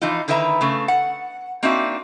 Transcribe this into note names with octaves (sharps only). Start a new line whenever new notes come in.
E3 F3 D#4 F4
D3 D#3 E4 B4 E5 A#5
C#3 A3
F#5
A#3 C4 D4 D#4 F#4 E5